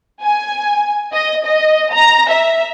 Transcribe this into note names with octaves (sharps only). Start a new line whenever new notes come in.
G#5
D#5
D#5
A#5
E5